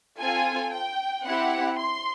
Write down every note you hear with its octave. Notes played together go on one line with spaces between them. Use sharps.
C4 F4 A4 G#5
G5
C4 E4 G4 F#5
C6